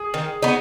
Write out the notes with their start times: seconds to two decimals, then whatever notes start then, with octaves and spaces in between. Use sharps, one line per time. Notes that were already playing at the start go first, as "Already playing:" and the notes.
Already playing: G#4
0.14 D#3
0.42 B3 D#4